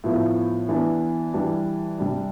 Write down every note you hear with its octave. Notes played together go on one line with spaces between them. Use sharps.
A2 F3 B3 E4
E3 B3 D4
E3 G3 D4
C3 G3 D4